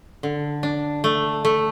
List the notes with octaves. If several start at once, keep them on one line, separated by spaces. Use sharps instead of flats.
D3
D4
A3
A3